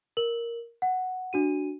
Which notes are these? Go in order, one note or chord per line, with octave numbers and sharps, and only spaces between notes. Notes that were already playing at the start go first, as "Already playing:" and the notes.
A#4 F#7
F#5
D4 F#4 D#7